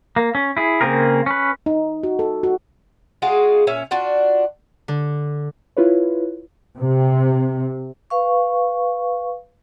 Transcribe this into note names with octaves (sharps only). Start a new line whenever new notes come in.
A#3
C#4
E4 G#4
C#3 A#3 C4 G#4 A#4
C#4 B4
D#4
F#4
A4
F#4
G#3 F4 F#4 G#4
A#2 C#4 E5
D4 F4 F#4
D3
E4 F4 B4 C#5
C3
B4 F5 C#6